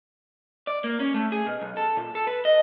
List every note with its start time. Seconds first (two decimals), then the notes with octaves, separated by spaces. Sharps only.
0.67 D5
0.84 A#3
1.00 C#4
1.14 A3
1.32 G#4
1.47 B2
1.61 B1
1.77 A4
1.97 A#2
2.15 A4
2.27 B4
2.45 D#5